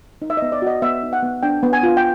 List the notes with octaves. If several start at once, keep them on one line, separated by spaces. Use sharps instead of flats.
D#4
E5
B3 D#5
D5
F#4 D#5
B3 E5
D#4
F#5
B3
D4 G5
B3
G#5
F4
G5